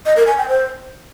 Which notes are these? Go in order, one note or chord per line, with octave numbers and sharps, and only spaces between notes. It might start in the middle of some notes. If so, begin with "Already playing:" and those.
D#5
A#4
G#5
G5
C5